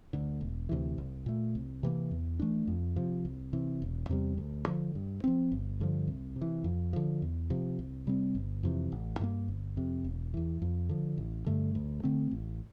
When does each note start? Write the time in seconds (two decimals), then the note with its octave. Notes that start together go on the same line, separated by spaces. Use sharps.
0.13 D2 D3
0.41 E1
0.69 D2 C3 E3
0.98 C2
1.26 A#2 A3
1.55 C2
1.83 C3 E3 A#3
2.11 E2
2.39 E3 A3 D4
2.67 F2
2.96 C3 F3
3.25 C2
3.53 C3 E3
3.82 E1
4.09 E2 C3 G3
4.38 D2
4.67 D3 F3
4.95 G2
5.24 F3 C4
5.52 G1
5.80 G2 D3 F3
6.08 C2
6.36 C3
6.41 E3
6.64 F2
6.93 D3 F3
7.22 E2
7.50 C3 F3
7.79 C2
8.07 C3 G3 C4
8.35 G1
8.63 F2 C3 E3
8.92 A1
9.19 G2 E3 A#3
9.48 G1
9.77 F2 C3
10.04 E1
10.34 E2 E3
10.62 F2
10.89 D3 F3
11.18 A1
11.46 G2 D3 A3
11.75 D2
12.03 D3 A3 C4
12.31 A1